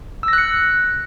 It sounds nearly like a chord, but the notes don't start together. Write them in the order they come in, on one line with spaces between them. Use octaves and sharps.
E6 A#6 F#6 C#7